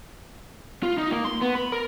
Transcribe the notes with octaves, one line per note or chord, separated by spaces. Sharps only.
F4
D#4
A#3
C6
B3
B5
A#4